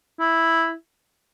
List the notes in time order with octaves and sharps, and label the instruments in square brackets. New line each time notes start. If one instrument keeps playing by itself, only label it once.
[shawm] E4